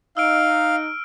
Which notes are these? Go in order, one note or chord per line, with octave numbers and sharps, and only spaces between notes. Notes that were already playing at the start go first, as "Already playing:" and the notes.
D#4 F5 E6 F6 D7